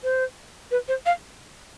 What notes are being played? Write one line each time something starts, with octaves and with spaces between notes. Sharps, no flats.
C5
B4
C5
F5